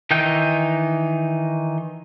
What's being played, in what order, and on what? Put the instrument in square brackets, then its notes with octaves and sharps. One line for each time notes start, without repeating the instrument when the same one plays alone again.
[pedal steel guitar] D#3 E3 D#4 G5 G6